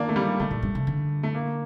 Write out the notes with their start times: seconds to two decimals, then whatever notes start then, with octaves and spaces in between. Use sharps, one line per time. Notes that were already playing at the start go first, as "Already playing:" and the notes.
Already playing: D#3 A#3 D4 F4
0.09 A3
0.16 G3
0.40 D3 A3
0.51 A#2
0.63 G2
0.75 C3
0.87 D3
1.23 A3
1.34 A#3